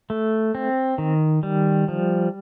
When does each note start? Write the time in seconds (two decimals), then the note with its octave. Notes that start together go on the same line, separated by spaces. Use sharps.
0.10 A3
0.55 C4
0.98 D#3
1.43 G3
1.88 F3